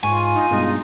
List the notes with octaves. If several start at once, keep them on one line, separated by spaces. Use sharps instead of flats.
G#2 F4 G#5 C#6
D#4
G2 B2 G#3 D#4